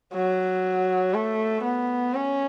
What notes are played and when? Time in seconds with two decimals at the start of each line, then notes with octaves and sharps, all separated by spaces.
0.14 F#3
1.14 A3
1.63 B3
2.14 C#4